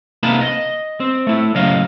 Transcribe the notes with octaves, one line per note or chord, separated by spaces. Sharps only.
C3 A#3 B3 D#4 A5 B5
D#5
C4
A3 E4
A2 C#3 F#3 A3 D#5 F5